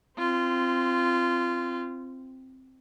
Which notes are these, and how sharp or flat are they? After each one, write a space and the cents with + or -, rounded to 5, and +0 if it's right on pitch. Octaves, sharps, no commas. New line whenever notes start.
C4 +0 F4 -20